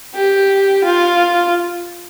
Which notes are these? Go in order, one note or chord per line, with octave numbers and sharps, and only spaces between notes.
G4
F4